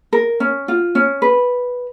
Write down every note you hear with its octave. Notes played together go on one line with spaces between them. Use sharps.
A#4
C#4
F4
C#4
B4